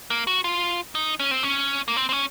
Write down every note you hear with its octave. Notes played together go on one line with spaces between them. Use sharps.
A#3
F#4
F4
D#4
C#4
C4
C#4
A#3
C4
C4
C#4